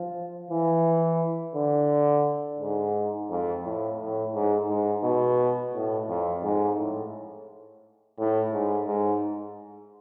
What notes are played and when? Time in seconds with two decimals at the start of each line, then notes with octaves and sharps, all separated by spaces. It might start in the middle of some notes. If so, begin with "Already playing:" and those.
Already playing: F3
0.51 E3
1.55 D3
2.60 G#2
3.30 F2
3.65 A2
3.99 A2
4.34 G#2
4.69 G#2
5.04 B2
5.74 A2
6.09 F2
6.43 G#2
6.78 A2
8.18 A2
8.52 G#2
8.87 G#2